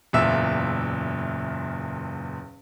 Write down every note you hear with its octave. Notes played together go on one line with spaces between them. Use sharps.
F#1 E2 A#2 E5 E6